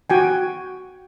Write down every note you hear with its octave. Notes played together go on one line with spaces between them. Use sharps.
F#4 G5 G#5